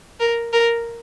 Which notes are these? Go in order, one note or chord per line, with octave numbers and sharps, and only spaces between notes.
A#4
A#4